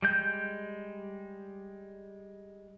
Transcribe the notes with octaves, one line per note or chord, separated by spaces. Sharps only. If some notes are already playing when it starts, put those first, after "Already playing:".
G3 G#3 G6